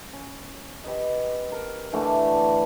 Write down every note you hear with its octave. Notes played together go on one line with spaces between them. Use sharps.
C#4
G4 B4 D#5
A#4
D3 E3 A3 D4